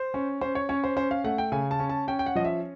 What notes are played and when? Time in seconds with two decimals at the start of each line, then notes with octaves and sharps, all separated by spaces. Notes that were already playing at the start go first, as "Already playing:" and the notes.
Already playing: C5
0.14 C#4
0.41 C#4 C5
0.55 C#5
0.69 C#4 C#5
0.84 C5
0.96 C#4 C5
1.11 F5
1.24 A3 F#5
1.38 G5
1.52 C#3 G#5
1.71 A5
1.80 C#4
1.89 A5
2.08 C#4 G5
2.19 G5
2.26 F#5
2.35 F3 D#5
2.45 E5